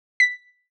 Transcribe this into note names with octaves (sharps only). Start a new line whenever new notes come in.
B6